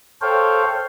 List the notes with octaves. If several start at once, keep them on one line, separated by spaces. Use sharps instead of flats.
A4 C5 C#5 F5 G5